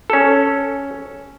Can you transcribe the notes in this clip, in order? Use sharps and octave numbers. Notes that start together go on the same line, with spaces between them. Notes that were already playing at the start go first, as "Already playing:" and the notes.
C#4 A4